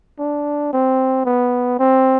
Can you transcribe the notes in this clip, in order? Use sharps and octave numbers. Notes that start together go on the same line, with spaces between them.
D4
C4
B3
C4